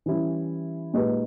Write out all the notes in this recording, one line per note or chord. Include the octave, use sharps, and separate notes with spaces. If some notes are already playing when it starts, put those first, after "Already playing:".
E3 G3 C#4 E4
A#2 G#3 D#4 G4 B4